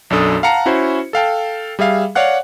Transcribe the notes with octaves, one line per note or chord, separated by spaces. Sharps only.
B1 F#2 D4 A4 D#6
F5 F#5 A5 A#5 C#7
C#4 E4 F#4 C5
A4 F5 G5 A5
G3 G#4 E5 F5
C#5 D5 F5 F#5 F#6